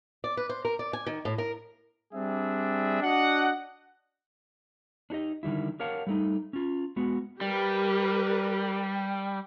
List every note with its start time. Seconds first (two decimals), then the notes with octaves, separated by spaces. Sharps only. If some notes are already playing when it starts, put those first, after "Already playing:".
0.24 D5
0.37 B4
0.49 C5
0.65 A#4
0.79 D5
0.93 G#5
1.06 D#3
1.25 A2
1.38 A#4
2.14 G3 C4 D4 G#4 E5
3.03 D4 F#4 D#5 F#5
5.10 D4 D#4 G4 D#5
5.43 D3 D#3 G3 E4
5.80 G4 A#4 C#5 F5 F#5 A5
6.07 G3 A3 D#4
6.53 C#4 F4
6.96 G#3 B3 F#4
7.41 G3 G4 A#4 B4